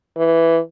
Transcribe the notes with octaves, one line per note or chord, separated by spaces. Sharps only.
E3